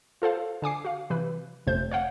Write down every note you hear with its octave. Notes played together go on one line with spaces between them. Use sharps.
F4 A4 C5 F5
D3 G#5 D6 C7
F#4 F5
C3 E3 B4
G1 F2 C3 A3 C5 G6
C#5 F5 F#5